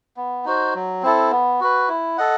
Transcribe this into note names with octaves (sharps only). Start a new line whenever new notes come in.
B3
D#4 F#4 C5
F#3
C4 E4 A4
B3
F#4 B4
E4
A4 D#5 F#5